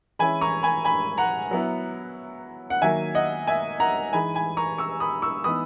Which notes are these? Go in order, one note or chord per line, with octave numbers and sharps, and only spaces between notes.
E3 G#3 C#4 E4 G#5 B5
A#5 C#6
G#5 B5
G#5 B5
F#5 A#5
F#3 B3 E4
F#5
D#3 F#3 A#3 E5 G#5
D#5 F#5
E5 G#5
F#5 A#5
E3 G#3 D#4 G#5 B5
G#5 B5
A#5 C#6
C#6 E6
B5 D#6
C#6 E6
E3 B3 D#4 B5 D#6